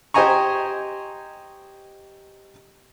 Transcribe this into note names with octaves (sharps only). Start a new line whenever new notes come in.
G4 C5 D#5 G#5 A#5 C#6